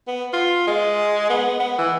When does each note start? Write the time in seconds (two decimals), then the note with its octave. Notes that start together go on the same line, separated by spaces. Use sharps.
0.07 B3
0.33 F4
0.67 G#3
1.30 B3
1.60 B3
1.78 E3